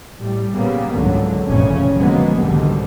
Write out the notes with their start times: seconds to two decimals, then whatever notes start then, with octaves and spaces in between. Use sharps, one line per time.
0.19 A2 G3
0.52 A#2 C#3 G3 A#3 B3
0.92 G#1 C#2 G#2 D3 F#3
1.46 F1 E2 A#2 C#3 C#4
1.96 D3 F3 F#3 G#3 A#3 B3
2.38 C2 G#2 B2 D3 D#3 G3